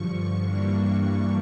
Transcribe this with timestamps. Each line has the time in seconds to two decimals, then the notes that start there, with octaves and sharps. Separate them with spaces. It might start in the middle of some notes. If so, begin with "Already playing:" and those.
Already playing: G2 D3 F3 C#6
0.42 G2 E3 G3 A#3 D4